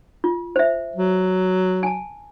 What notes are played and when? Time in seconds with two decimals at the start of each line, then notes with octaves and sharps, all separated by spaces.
0.24 F4
0.56 C5 E5
0.96 F#3
1.83 G#5 A5